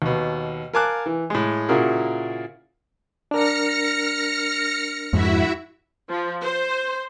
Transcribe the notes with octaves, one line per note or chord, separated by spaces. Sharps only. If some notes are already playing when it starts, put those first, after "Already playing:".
D#2 B2
A#4 F5 G#5 A5 D6 F#6
E3
A2 G#3
A#2 C#3 E4 F#4 G#4 A#4
D4 A#4 F6 A#6 C#7
F2 G#2 E4 F#4 E5
F3
C5